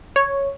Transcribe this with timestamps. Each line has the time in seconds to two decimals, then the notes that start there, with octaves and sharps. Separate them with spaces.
0.16 C#5